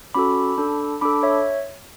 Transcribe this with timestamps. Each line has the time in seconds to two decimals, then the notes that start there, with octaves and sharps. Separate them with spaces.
0.15 C#4 F#4 A4 B5 D6
0.58 D4 A4
1.01 D4 A4 B5 D6
1.23 C#5 E5